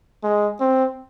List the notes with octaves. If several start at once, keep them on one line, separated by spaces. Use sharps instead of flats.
G#3
C4